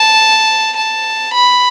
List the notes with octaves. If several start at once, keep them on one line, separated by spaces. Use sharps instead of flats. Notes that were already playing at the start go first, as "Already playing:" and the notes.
Already playing: A5
A5
B5